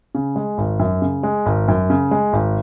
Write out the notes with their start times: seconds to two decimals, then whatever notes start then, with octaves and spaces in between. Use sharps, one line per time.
0.15 C#3
0.36 G#3
0.58 G#1
0.79 F#2
1.02 C#3
1.23 G#3
1.46 G#1
1.68 F#2
1.90 C#3
2.11 G#3
2.33 G#1